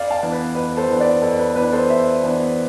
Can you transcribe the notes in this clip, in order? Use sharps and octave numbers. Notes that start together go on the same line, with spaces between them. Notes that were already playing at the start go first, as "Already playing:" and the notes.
Already playing: F2 D5 F5
F5 A5
E3 B3 D4
B4
F2 B4
A4 C5
E3 B3 D4
B4 D5
F2 A4
B4
E3 B3 D4 B4
A4 C5
F2 C5 E5
E3 B3 D4